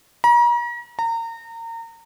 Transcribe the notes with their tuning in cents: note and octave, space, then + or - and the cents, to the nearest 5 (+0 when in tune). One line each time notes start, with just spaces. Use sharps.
A#5 +40
A#5 -30